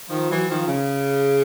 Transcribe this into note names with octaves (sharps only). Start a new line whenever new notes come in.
D#3 F3
E3 F#3
D#3 F3
C#3